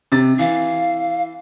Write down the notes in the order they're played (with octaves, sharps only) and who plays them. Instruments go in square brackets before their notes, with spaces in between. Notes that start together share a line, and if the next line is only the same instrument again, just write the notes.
[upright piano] C3 A6
[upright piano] E3 [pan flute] F5